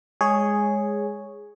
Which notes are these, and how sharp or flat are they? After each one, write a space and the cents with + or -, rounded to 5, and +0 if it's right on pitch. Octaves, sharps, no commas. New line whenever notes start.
G#3 -5 G#4 +0 C#5 +0